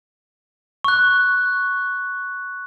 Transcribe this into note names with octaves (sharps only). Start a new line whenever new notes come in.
C#6 F#6